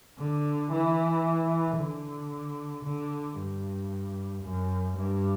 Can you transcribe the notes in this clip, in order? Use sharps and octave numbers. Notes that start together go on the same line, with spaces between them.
D3
E3
D3
D3
G2
F#2
G2